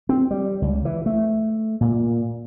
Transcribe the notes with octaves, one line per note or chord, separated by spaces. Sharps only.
C4
G3
C#2
E3
A3
A#2